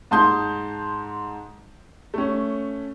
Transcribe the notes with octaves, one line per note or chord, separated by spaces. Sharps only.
G#2 A5 C6 D#6 G6
A3 C#4